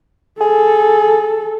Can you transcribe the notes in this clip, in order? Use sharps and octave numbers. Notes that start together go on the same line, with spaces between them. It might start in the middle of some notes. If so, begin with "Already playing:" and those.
G#4 A4